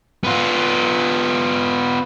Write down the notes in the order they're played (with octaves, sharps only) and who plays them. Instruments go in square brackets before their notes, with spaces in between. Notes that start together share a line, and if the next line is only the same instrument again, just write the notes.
[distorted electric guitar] B3 F4